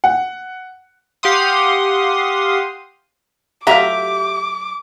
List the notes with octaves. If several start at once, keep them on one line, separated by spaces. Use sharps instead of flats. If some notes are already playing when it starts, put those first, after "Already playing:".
F#5
G4 F5 F#5 C6 D#6
F#3 A3 F4 G4 E5 A#5 D6